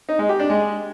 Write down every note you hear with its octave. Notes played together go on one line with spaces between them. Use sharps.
D#4
G#3
G4
D4
G#3